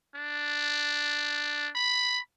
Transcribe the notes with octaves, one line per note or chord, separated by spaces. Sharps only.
D4
B5